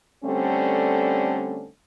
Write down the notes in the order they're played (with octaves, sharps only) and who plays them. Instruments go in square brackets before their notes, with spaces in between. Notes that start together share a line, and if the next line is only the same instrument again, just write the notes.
[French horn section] D3 G3 A3 C4 C#4